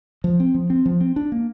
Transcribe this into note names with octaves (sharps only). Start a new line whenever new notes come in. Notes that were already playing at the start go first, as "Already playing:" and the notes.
F3
C4
F3
C4
F3
C4
D4
A#3